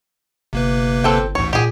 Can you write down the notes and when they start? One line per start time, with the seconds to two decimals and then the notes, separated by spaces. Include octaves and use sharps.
0.53 G1 C3 A#3 B4
1.04 G1 C4 A4 G5
1.35 A1 D2 G#2 C#5
1.53 A#2 G4 G#4